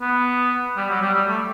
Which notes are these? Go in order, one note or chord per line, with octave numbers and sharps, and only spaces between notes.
B3
G3
F#3
G3
G3
A3